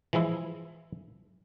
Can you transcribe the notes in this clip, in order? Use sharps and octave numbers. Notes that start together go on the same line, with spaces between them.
E3 F3 G#3 E4